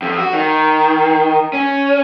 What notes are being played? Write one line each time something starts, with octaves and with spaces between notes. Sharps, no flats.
F2
F#4
D#3
C#4